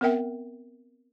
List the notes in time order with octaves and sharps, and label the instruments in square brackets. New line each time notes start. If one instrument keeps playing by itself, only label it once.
[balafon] B3 C4 A#4 E5 G5